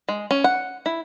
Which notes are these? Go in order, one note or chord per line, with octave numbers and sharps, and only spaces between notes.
G#3
C#4
F#5
E4